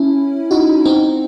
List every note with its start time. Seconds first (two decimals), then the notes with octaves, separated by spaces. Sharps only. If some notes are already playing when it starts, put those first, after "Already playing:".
Already playing: C#4 E4
0.51 D#4 F#4
0.85 C4 D#4